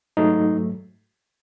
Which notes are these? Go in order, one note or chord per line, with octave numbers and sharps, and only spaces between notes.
G#2 F#3 A3 D#4